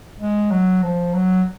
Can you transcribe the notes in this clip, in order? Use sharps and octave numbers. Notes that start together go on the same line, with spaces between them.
G#3
F#3
F3
F#3